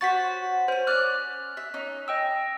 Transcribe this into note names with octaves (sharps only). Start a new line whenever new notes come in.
F#4 C5 C#5 A6 B6
C#4 C5 G#5
C#4 D5 F6 F#6
E5
C#4 D#4
D#5 G5 E6